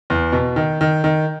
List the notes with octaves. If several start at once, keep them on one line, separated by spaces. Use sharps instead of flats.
E2
B2
D#3
D#3
D#3